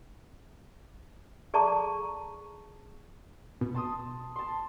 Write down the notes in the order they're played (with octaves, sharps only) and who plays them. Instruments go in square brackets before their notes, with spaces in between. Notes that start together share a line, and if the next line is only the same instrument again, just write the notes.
[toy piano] G#4 A4 D5 A5 A#5 C#6
[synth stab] B2
[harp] A5 C6 D#6
A5 C6